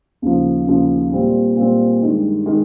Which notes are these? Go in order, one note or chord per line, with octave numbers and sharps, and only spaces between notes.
D#2 C#3 F3
D#2 C#3 F3
A#2 G3 C4
A#2 G3 C4
G2 D#3 G#3
D#3 G#3